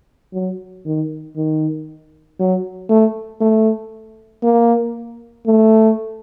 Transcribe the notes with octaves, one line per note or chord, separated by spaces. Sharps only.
F#3
D#3
D#3
F#3
A3
A3
A#3
A3